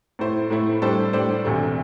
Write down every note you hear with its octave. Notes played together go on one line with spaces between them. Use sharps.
A2 A3 E4 C5
A2 A3 E4 C5
A2 G3 D4 A4 C5
A2 G3 D4 A4 C5
E1 D2 C3 A3